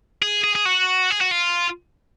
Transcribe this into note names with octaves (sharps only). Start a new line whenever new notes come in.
G#4
G#4
G#4
F#4
G#4
F#4
F4